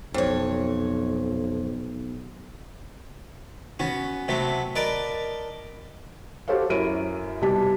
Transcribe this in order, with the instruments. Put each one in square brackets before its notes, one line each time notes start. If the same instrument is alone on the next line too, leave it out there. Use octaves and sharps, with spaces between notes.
[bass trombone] B1 [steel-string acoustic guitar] F2 C#5
[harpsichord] B3 C#4 F#4
C3 F#3 A3 B3
A#4 B4 D5 D#5 A5
[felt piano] F#4 G4 A4 C5 C#5 F5
F#2 E4 A#4 C#5 D7 D#7
B1 C3 G3 A5 B6